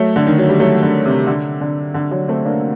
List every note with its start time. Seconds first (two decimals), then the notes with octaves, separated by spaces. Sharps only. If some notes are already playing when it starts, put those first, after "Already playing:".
Already playing: F#3 A3
0.16 D3
0.27 D#3
0.38 F#3
0.49 G3
0.60 F#3 A3
0.82 D3
1.06 C3
1.27 D3
1.61 D3
1.94 D3
2.11 D3 F#3
2.28 A3 C4
2.46 A#3 D4